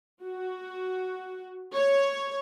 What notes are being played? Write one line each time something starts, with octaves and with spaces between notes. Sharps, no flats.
F#4
C#5